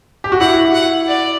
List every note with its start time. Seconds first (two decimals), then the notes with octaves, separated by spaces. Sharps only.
0.24 G4
0.32 F#4
0.41 E4 F#5
0.74 F#5
1.08 D5